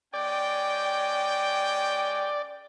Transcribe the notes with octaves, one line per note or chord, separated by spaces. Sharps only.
G#3 C#4 D5 G5